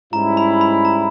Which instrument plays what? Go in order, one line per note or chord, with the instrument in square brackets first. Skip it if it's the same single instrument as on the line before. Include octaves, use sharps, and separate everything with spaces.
[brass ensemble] G#2 G3 C#4 E4 [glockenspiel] A#5
[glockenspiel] B5
B5
A#5